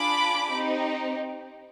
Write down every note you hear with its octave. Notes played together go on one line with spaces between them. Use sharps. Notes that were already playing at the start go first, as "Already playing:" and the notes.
Already playing: D4 F4 G#4 B5 D6
C4 D#4 G4